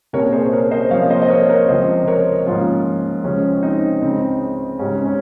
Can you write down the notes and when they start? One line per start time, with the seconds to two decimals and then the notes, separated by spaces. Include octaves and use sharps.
0.13 C2 A#2 G3 C4 A#4 C#5
0.32 G#4 C5
0.52 A#4 C#5
0.71 C5 D#5
0.91 C2 C3 F3 A#3 C#5 F5
1.10 C5 D#5
1.22 D#5
1.29 A#4 C#5
1.49 A#4 C#5
1.69 C#2 C3 F3 C4 C5 D#5
2.08 A#4 C#5
2.46 G#2 F3 A#3 C#4 F4
3.24 C#2 C3 F3 G#3 C4 C#4
3.63 C4 D#4
4.02 C#2 C#3 G#3 C4
4.79 G#2 G3 C4 C#4
5.05 C#4